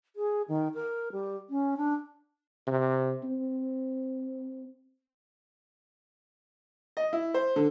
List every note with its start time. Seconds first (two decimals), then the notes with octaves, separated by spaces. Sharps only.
0.16 G#4
0.48 D#3
0.74 A#4
1.12 G3
1.50 C#4
1.77 D4
2.67 C3
3.23 C4
6.97 D#5
7.13 E4
7.34 C5
7.56 D3